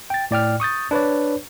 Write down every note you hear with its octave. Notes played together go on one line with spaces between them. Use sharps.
G5 A6
A2 D5 G5 F6
C#6 D#6 G6 A6
D4 B4 C#5 D5